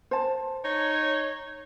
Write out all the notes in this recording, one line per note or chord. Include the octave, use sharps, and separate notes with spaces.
C5 A5
D#4 C#5